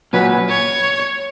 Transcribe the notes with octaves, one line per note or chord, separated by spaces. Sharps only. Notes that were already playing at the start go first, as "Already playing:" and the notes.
A#2 F#3 C#4 F#4 B4
C#5